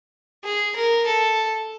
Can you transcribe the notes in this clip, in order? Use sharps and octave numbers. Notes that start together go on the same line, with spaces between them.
G#4
A#4
A4